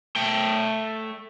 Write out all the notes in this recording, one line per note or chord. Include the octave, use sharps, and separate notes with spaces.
A3 G5